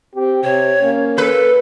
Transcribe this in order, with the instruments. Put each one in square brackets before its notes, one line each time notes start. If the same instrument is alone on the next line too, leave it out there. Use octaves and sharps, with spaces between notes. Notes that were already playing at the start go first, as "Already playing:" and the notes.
[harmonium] C4 [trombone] G4
[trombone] C3 [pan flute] C#5
[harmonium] A#3 [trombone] C#4
[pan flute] A4 [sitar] B4